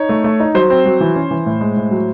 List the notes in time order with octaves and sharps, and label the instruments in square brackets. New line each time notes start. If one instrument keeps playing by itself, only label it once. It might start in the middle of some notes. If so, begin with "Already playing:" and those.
Already playing: [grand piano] D#4 C#5
A3
A3
D#4
F#3 C5
C4
F#3
E3
C#4
E3
A2
G#3
A2
F#3